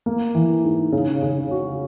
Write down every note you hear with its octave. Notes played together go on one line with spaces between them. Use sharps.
A#3
E3
G#2
C#3
C#3
F#4